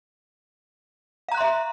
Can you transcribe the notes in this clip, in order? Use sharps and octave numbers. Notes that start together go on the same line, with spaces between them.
E5 F5 A#5 C6 F#6